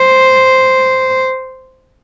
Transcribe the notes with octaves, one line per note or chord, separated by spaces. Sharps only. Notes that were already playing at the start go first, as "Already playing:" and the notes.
Already playing: C5